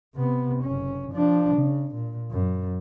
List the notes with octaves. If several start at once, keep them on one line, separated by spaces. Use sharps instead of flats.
C3 B3
F#1 C#4
F3 D4
C#3
A#2
F#2